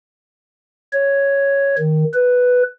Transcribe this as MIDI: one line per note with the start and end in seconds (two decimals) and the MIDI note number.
0.93 1.76 73
1.79 2.04 51
2.14 2.63 71